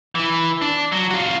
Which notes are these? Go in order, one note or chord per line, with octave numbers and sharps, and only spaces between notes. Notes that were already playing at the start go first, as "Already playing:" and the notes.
E3 E4
D4
F#3
F4 F#4